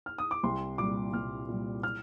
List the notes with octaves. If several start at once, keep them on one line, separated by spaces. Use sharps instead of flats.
F6
D#6
D6
C2 C6
A#2 G3 D6
C2 F6
A#2 G3
F6